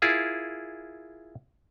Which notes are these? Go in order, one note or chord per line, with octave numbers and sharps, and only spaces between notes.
E4 F4 G#4 A#4